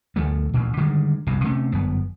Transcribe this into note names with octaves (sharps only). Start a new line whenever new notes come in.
D2 F3 A3
A1 D2 A#2
D3 D#3 G3 G#3
F1 C2 G2 B2
C3 A3 C4 C#4
G1 F#2 B3